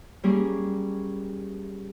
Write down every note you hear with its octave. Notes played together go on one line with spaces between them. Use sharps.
G3 A#3 C#4 G#4